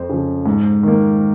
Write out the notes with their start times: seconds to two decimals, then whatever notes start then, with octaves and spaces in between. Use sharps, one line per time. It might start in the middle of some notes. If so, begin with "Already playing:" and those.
Already playing: F2 C5
0.09 C#3 F3
0.46 G#2
0.83 D#3 A#3